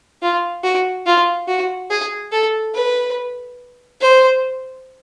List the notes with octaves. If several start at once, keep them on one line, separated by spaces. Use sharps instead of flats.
F4
F#4
F4
F#4
G#4
A4
B4
C5